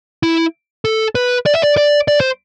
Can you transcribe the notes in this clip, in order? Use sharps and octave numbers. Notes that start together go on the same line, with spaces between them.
E4
A4
B4
D5
E5
D5
D5
D5
C5